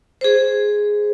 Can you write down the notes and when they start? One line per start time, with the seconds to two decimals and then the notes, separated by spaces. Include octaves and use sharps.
0.21 G#4 C5